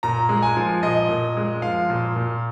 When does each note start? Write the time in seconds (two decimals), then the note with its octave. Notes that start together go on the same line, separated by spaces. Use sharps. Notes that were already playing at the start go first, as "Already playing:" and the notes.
0.03 A#2 A#5
0.29 G#3
0.42 G#5
0.57 F3
0.83 A#2 D#5
1.09 A#2
1.37 G#3
1.62 F3 F5
1.90 A#2
2.16 A#2